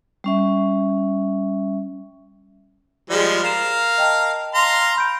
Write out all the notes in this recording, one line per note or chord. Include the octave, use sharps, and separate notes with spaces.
G3 C#4 E5
F3 G3 G#3 G#4 D5
A#4 F5 C7 E7
D#5 G5 A5
F5 A#5 C6
B5 G6 D7